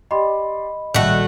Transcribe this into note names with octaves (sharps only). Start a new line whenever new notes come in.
G4 D5 D#5 B5 C6
A#1 D#3 G3 A3 F#4